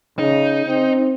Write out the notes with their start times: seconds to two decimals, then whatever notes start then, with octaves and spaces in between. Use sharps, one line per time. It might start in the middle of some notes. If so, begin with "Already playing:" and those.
0.19 C#3 D#4
0.66 C4